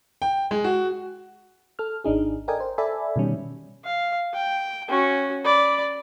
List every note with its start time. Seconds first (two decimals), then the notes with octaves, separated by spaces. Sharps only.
0.22 G5
0.51 G#3
0.64 F#4
1.79 A4 F6
2.04 G#1 D4 D#4 G#4
2.48 A4 A#4 D5 D#5 G5 G#5
2.60 C5
2.78 A4 D5 E5 G#5 B5
3.16 B2 D#3 G3 C#4
3.84 F5
4.34 G5
4.89 C#4 F#4
5.45 D5 B5